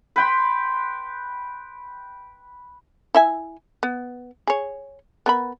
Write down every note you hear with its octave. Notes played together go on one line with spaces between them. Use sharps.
B4 G5 C6
E4 E5 G#5
B3
G#4 C#5
B3 A#4 B5